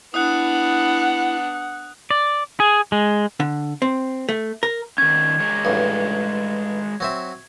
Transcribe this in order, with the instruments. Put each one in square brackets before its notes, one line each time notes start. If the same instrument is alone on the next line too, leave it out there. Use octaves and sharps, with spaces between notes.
[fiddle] B3 D4 [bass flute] E4 [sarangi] F#5 [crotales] D#6 F#6
[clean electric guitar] D5
G#4
G#3
[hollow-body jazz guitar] D3
C4
A3
A#4
[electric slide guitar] D#3 C#4 [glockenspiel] G#6
[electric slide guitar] G#3 A#4 C#5
[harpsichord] A1 G2
F#3 C4 E5